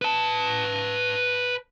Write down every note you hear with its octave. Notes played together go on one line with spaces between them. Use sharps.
B4 A5